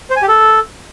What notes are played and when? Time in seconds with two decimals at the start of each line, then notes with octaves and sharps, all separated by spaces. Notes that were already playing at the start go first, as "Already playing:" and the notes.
0.10 C5
0.16 G#5
0.22 G4
0.28 A4